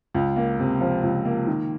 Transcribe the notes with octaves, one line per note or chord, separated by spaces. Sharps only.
C#2
A#3
C3
F3
C#2
A#3
D#3